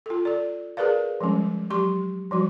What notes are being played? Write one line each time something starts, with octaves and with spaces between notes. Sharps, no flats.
F4 A4
A4 D5
G#4 A#4 B4 D5 F5
F3 G3 G#3 C#4
F#3 G4 C6 C#6
F3 G3 F#4